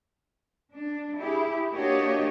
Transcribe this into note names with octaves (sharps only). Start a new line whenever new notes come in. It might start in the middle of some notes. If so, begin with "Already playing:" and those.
D4
E4 G4 G#4
A#3 D4 F#4 G4 C#5 D#5